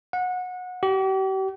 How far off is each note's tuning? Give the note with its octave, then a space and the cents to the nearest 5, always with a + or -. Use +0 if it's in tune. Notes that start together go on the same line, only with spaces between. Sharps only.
F#5 -25
G4 -40